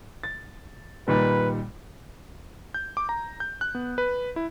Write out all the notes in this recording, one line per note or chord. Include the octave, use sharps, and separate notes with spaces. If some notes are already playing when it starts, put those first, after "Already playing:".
A6
A#2 D#3 G3 B4
G6
D6
A#5
G6
F#6
B3
B4
E4